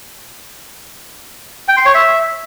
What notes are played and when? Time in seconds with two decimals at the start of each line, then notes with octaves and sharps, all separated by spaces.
1.68 G5
1.77 C6
1.86 C#5
1.94 E5